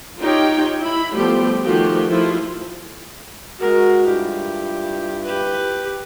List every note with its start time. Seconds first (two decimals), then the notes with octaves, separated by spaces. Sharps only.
0.19 D#4 F4 G4 C#5 G5
0.82 E4 B5
1.15 F3 G3 A3 B3 G4
1.62 D#3 F3 A3 F#4 G4
2.07 F3 A3 E4 F4
3.60 G#3 F#4 A#4
4.06 G2 E4 F4 G4
5.25 G4 B4